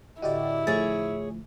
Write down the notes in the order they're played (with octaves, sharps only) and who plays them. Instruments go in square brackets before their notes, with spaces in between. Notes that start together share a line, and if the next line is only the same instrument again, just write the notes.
[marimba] A2 D3 D#5 [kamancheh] E4 [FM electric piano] F#4 G4 D5
[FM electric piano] A2 F3 [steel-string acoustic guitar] G#4 C#5 [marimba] A6